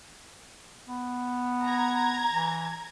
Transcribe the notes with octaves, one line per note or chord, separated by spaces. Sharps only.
B3
A#5 G#6
E3